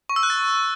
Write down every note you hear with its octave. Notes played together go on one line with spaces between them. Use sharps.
C#6
E6
F#6
A6